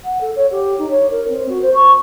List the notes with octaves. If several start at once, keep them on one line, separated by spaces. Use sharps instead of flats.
F#5
A4
C#5
G4
D#4
C#5
A#4
C4
F#4
C5
C#6